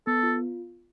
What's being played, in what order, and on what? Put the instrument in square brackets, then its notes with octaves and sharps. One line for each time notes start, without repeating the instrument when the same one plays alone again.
[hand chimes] B3 [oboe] A4
[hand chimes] F4